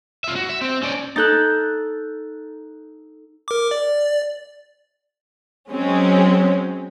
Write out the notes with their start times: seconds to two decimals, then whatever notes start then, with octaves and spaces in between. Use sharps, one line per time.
0.24 F4 E5
0.36 F#4
0.49 E5
0.62 C4
0.83 C#4 D5
1.16 D#4 A4 F#6 G6 A6
3.48 A#4 D6
3.71 D5
5.70 F#3 G#3 C4 C#4